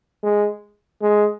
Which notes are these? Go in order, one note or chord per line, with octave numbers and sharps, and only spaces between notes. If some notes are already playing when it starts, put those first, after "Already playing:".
G#3
G#3